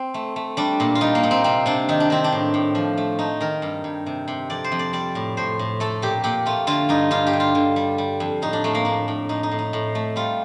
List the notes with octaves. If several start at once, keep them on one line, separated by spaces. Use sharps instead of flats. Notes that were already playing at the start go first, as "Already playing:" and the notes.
Already playing: C4
A3
A3
G3 D4
A#2
F4
G3 D#4
A#3
A#2
C4
C3 C4
C3 D4
D#3 D#4
D4
D#3 C4
D4
A2
A2
F3
A3
A3 D#4
D#3 A#4
G2
G2
C3
C3
F2 D5
C5
F2
D5
G3 D5
A2
A2 C5
A2
A3 A4
A#2 G4
A#2 G4
A3 F4
D3 F4
G2 D#4
G2 F4
G4
D3
F4
D3
G3
G3
F2
A2 D#4
D4
A2 A3
A#3
A2 D4
A2
A2 D#4
D#4
A2
D#4
A2
A3
G3 F4